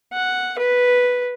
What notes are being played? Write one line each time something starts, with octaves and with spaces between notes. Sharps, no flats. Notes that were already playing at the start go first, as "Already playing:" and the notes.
F#5
B4